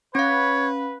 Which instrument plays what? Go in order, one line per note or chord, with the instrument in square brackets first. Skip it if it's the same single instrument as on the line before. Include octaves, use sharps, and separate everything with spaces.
[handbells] C#4 F5 [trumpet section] B4 [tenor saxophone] C#5